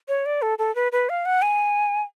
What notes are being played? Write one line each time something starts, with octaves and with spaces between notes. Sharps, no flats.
C#5
D5
A4
A4
B4
B4
F5
F#5
G#5